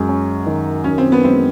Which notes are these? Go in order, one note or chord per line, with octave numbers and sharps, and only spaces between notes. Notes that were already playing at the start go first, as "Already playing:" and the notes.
Already playing: F#2 G#3
C#4
D#3
F#2 C#4
C4
B3
G#3 C4